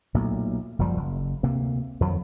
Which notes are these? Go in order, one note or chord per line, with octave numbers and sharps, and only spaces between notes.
B1 A#2 F#3 A3
F#1 F#2 F3 G3
F#1
D2 C3 A#3
F2 D#3 F3 F#3